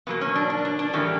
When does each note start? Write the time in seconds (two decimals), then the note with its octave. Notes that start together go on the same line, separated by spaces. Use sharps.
0.07 B2 F#3 A#3 B3
0.21 C#4
0.35 D4
0.50 D4
0.65 D4
0.79 D4
0.93 A2 E3 G3 A#3 C#4